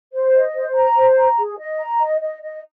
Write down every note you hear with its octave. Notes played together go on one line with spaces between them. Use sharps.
C5
D#5
C5
A#5
C5
A#5
G#4
D#5
A#5
D#5
D#5
D#5